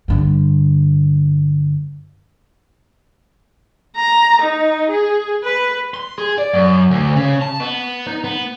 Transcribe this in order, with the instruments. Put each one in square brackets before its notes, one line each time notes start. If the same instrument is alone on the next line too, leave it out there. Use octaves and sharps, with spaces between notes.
[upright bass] G2 D3
[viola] A#5
D#4
G#4
B4
[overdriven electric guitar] C6
G#4
D5
F#2
D2
C#3
A5
B3
D#4
B3